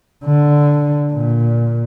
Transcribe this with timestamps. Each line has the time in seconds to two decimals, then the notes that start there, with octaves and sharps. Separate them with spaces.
0.25 D3
1.13 A#2